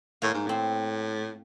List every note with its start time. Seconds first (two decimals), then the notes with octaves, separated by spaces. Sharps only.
0.22 A2 A#3
0.34 G#2
0.47 A2 C4